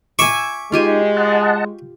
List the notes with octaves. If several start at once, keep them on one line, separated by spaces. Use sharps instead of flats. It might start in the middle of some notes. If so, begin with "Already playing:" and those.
E5 G#5 C#6 D6
G#3 D#4 F4 G4 G#5
D#5 F#5 A5